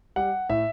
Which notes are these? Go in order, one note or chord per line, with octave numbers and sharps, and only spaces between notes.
G3 F#5
A2 E5